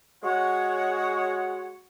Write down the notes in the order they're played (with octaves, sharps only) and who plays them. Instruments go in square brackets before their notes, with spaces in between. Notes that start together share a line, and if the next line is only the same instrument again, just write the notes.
[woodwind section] G#3 F#4 C#5 F#5